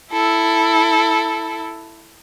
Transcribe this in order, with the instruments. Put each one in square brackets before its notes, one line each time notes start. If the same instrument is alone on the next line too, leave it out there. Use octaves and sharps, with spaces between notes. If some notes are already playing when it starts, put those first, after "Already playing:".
[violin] E4 A4